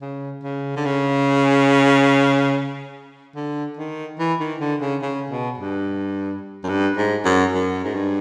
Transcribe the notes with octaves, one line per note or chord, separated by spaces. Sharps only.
C#3
C#3
D3
C#3
D3
D#3
E3
D#3
D3
C#3
C#3
B2
G2
F#2
G2
G#2
F#2
F#2
G#2
G2